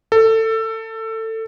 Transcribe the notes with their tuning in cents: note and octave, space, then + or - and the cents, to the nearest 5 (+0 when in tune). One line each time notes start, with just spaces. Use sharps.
A4 +20